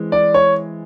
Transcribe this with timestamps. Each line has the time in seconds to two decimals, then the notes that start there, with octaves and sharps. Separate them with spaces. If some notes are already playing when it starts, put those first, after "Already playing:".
Already playing: E3 G#3 C4
0.12 D5
0.34 C#5